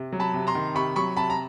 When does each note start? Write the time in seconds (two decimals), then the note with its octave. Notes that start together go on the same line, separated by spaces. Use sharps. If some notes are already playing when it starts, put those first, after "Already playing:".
Already playing: C3
0.12 F#3
0.20 A5 B5
0.34 C3
0.47 A#5 C6
0.55 D#3
0.75 C3 B5 C#6
0.96 F#3 B5 C#6
1.16 C3 A5 B5
1.30 A#5